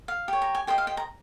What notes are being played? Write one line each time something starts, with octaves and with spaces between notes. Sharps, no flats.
F5
G4 C#5
A#5
G#5
G4 C5 D#5 G5
F5
G5
A#5